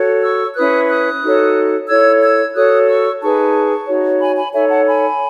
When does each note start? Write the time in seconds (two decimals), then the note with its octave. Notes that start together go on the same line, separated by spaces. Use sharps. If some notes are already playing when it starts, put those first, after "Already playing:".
Already playing: F#4 A4 C#5
0.23 C#6 E6
0.57 C#4 E4 B4 D#6 F#6
0.89 D#6 F#6
1.23 D#4 F#4 A4 C#5
1.89 E4 A4 C#5 E6 G#6
2.22 E6 G#6
2.55 F#4 A4 C#5 D#6 F#6
2.88 C#6 E6
3.21 D#4 G#4 B4 A5 C#6
3.87 D#4 F#4 C#5
4.20 G#5 B5
4.37 G#5 B5
4.53 D#4 A4 C#5 E5 G#5
4.69 F#5 A5
4.86 G#5 B5